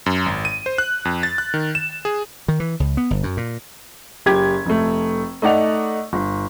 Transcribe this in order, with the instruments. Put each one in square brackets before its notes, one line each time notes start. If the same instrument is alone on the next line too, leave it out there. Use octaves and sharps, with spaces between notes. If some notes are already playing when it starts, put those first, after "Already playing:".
[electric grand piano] F#2
G#1
D#7
C5
F#6
F2
A6
F#6
D#3
E7
G#4
[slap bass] D#3
E3
C#2
B3
G1
F#2
A#2
[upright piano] F#1 G4 G#6
F1 A3
A3 D#4 D5 F#5 F7
G1